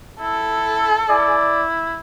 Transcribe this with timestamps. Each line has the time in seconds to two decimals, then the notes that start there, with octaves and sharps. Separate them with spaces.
0.20 E4 A4
1.10 E4 D5